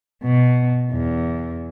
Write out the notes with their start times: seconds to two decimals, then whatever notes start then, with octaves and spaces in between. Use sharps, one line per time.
0.24 B2
0.91 E2